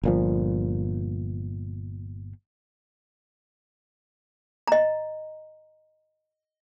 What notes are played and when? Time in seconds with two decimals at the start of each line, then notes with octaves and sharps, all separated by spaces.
0.04 G1 A#2 F3
4.68 D#5 A#5